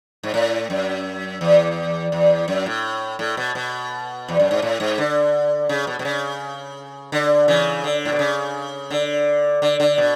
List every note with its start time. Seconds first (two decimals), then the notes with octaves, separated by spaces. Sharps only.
0.23 G#2
0.34 A2
0.70 F#2
1.41 E2
2.12 E2
2.48 F#2
2.66 A2
3.19 A2
3.37 B2
3.55 B2
4.29 E2
4.40 F#2
4.51 G#2
4.62 A2
4.80 G#2
4.98 D3
5.69 C#3
5.87 B2
5.99 B2
6.05 C#3
7.12 D3
7.48 C#3 E3
7.84 D3
8.05 A2
8.12 B2
8.19 C#3
8.91 D3
9.62 D3
9.80 D3
9.98 B2